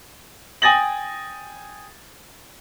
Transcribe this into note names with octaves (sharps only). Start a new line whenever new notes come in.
G5 G#5 D#6 A6 A#6 F#7